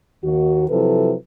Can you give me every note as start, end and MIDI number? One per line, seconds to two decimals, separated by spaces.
0.25 0.66 39
0.25 0.66 51
0.25 0.66 66
0.70 1.14 48
0.70 1.14 53
0.70 1.14 54
0.70 1.14 64
0.70 1.14 69
0.70 1.14 71